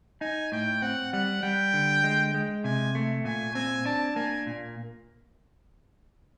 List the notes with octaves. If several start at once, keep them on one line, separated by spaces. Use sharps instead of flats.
D#4 G#5
A2 G5
C4 F#5
G3 F#5
G3 G5
D3
G#3
G#3
C3 G#5
A3
A#2 G#5
C4 G#5
D4 A5
A#3 G#5
A#2